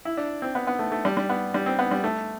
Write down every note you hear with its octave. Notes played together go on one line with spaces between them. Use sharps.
E4
D4
C4
B3
B3
A3
A3
G3
G3
B3
G3
C4
B3
G3
A3